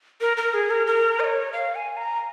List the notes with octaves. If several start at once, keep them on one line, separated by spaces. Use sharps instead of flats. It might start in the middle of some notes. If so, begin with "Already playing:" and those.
A#4
A#4
G#4
A#4
A#4
D#5
C#5
F5
G#5
A#5